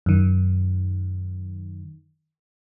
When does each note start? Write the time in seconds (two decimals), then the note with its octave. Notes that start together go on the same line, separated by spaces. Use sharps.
0.06 F#2 D#3